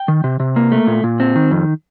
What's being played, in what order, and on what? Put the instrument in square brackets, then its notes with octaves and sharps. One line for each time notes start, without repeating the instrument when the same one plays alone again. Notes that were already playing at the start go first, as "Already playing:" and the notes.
Already playing: [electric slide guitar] G5
D#3
C3
C3
A#3
A3
A#2
A#2
C4
D#3
F2